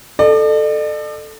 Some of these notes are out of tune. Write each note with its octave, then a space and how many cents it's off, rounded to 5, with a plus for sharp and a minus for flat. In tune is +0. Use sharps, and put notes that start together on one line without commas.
A4 +0 D5 +45